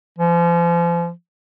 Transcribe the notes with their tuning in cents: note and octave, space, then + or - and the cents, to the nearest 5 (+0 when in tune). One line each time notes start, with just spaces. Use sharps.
F3 -35